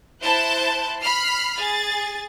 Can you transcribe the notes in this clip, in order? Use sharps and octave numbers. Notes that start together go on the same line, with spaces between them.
E4 C5 A5 F#6 G6
B5 F6 C7
G#4 A6